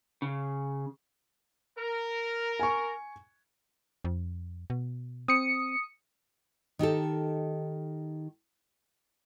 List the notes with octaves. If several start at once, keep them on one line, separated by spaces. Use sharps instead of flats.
C#3
A#4
G#5 C#6
F2
B2
C4 D#6 C#7
D#3 D#4 G4 A4